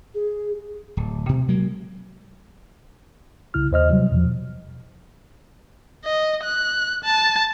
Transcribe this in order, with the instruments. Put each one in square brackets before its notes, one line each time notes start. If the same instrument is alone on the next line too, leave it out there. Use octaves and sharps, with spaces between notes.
[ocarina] G#4
[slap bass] D1
B2
F#3 G#3 A#3
[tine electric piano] C2 C#3 E4 F6
D#2 C5 D#5 F6
C3 F#3 G3
E2 B2 F3
[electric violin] D#5
F#6
A5